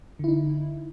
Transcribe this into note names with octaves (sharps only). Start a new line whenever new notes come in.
D3 D#4 E4